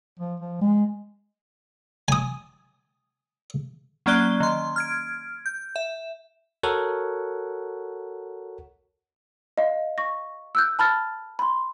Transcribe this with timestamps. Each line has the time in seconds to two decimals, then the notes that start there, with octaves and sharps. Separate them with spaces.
0.19 F3
0.40 F3
0.61 G#3
2.08 G#5 D#6
4.06 F#3 A#3 C#4 D5 F#6 G7
4.40 D#3 C6
4.76 F6 G#6 D7
5.46 G6
5.76 E5
6.63 F#4 A4 A#4 C#5 F#5
9.58 D#5 F5
9.98 C#6 A#6
10.55 E6 F#6 G6
10.79 A5 B5 F6 A6
11.39 B5 C6